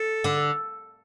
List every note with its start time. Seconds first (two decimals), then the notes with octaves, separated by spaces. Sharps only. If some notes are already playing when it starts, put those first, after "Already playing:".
Already playing: A4
0.24 D3